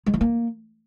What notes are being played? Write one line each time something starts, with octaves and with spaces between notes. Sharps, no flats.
G#3
E3
A#3